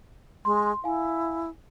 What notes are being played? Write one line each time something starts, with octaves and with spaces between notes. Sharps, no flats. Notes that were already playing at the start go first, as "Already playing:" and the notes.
G#3 C6
E4 F5 G#5